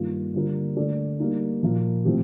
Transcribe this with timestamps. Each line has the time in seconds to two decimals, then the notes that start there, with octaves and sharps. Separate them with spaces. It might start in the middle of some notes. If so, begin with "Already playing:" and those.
Already playing: G2 D#3 A#3 F4
0.34 D3 G3 A#3 F4 A#4
0.76 D3 A3 D4 A4 D5
1.20 G3 A#3 D#4
1.63 A#2 F3 A#3 F4
2.05 A2 F3 C4 G4